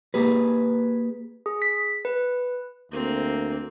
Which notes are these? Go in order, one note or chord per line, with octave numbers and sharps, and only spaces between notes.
A#3 G4 G#4 B4
G#4
B6
B4
D2 A#3 C4